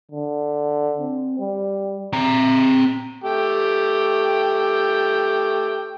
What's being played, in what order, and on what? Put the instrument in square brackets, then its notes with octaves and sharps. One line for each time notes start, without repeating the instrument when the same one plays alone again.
[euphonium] D3
C4
G3
[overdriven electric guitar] C4 A#5
[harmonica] A3 G4 G5